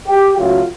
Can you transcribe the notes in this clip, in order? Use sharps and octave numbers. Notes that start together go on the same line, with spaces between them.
G4
C#2 C#3 F#3 A3 F4